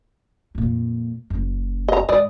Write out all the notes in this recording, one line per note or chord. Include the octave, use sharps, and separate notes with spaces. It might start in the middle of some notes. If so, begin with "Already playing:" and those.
F2 A#2
F#1 F#2
D#5 A#5
G#2 D5 D#5